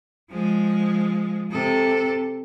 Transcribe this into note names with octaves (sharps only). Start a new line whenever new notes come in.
F3 G#3
C3 A4